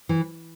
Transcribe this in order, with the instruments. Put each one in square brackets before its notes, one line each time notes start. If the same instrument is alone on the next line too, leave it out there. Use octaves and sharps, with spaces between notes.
[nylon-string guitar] E3